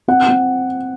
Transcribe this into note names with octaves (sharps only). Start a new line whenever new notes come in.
C4 F#5
C4